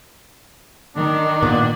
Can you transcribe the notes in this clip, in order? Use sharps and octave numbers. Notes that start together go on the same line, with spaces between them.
D#3 D4
A#2 B3